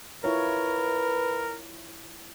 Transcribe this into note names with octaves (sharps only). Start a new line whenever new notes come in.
E4 F4 A#4 B4 C#5